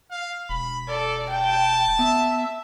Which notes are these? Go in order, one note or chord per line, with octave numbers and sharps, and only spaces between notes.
F5
E1 B5
A4 D5
G5 A5
B3 E5